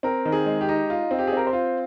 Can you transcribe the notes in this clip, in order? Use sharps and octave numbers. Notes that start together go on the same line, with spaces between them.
C4 A#4
D#3
G#4
G#3
G4
D#4
F4
C4
G4
G#4
C4 A#4
C5
F4